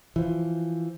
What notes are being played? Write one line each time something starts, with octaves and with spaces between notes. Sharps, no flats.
E3 F3